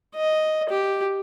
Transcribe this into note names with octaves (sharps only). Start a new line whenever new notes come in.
D#5
G4